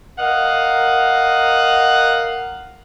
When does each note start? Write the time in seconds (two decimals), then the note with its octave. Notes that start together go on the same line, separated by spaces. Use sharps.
0.18 A#4 D#5 F5 F#5